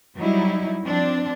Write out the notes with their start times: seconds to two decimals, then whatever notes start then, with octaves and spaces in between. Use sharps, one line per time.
0.17 F#3 G3 D#4 E4
0.84 F3 C4 D4